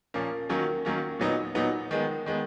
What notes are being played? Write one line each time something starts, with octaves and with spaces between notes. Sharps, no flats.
A#2 F3 A#3 C#4
D#3 F#3 A#3 C#4
D#3 F#3 A#3 C#4
A#2 F#3 B3 D#4
A#2 F#3 B3 D#4
D#3 G#3 B3
D#3 G#3 B3